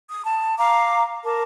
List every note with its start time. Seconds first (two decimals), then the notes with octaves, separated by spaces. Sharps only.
0.09 D#6
0.24 A5
0.58 F5 A#5 D6
1.24 A#4 A5 D6